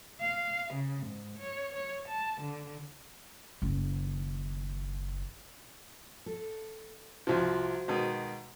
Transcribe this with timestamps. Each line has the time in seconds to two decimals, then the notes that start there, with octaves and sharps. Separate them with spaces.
0.20 F5
0.74 C#3
1.06 G#2
1.37 C#5
1.74 C#5
2.08 A5
2.41 D3
3.62 F#1 D#3
6.26 A4
7.27 C2 F3 F#4 C5 F5
7.88 B2 D#3 G#3